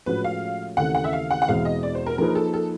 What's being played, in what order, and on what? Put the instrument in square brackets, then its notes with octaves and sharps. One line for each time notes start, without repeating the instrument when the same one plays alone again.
[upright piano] A2 F3 G#3 C#4 F#4 [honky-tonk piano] B4
[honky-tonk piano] F5
[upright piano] D#2 C#3 E3 A3 C4 [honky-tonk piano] F#5
[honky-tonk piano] F#5
E5
F5
F#5
F#5
[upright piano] E2 B2 G#3 C4 E4 [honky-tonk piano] F5
[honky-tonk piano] D#5
D5
C5
A#4
[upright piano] F3 A#3 D#4 G#4 B4 [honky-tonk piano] A#4
[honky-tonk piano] A4
A4